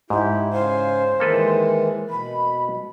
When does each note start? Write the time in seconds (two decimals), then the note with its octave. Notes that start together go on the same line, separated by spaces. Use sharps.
0.10 G#2 E4 G4
0.53 C#3 C5 F5 G#5
1.20 D#3 E3 G#3 A#3 A4 B4
2.10 B2 B5